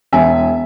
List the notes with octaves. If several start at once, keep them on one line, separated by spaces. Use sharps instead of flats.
E1 E5 G#5